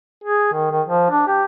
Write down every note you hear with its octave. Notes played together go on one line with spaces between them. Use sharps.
G#4
D#3
D#3
F3
D4
G4